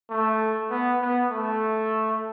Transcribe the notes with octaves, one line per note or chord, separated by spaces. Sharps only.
A3
B3
B3
A3